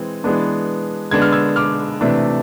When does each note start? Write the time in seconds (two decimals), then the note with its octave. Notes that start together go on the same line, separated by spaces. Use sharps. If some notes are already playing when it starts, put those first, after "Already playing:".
Already playing: E3 G#3 C4
0.24 E3 G#3 B3 D4
1.11 D3 G#3 B3 D4 G#6
1.22 F6
1.32 E6 G#6
1.56 D6 F6
2.01 C3 E3 A3 D4